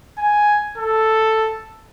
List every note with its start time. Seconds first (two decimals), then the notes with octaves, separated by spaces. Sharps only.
0.18 G#5
0.78 A4